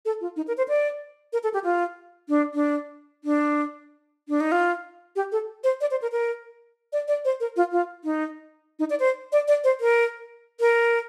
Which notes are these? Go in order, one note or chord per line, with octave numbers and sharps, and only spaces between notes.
A4
F4
D#4
A#4
C5
D5
A#4
A4
G4
F4
D4
D4
D4
D4
D#4
F4
G4
A4
C5
D5
C5
A#4
A#4
D5
D5
C5
A#4
F4
F4
D#4
D#4
D5
C5
D5
D5
C5
A#4
A#4